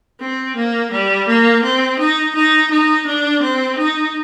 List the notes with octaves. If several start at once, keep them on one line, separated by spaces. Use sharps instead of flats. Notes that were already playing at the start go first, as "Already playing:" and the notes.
C4
A#3
G3
A#3
C4
D#4
D#4
D#4
D4
C4
D#4